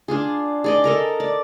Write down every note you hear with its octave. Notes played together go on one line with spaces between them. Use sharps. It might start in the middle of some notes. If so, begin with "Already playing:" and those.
D4 F4 G#4
G#4 D5 D#5
A4 A#4 D#5
D5